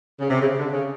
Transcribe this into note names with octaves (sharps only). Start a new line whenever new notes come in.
C#3
C3
C#3
D3
C#3